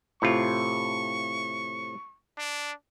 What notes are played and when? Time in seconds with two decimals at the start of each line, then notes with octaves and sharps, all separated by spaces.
0.22 A2 C3 F4 C#6
2.37 D4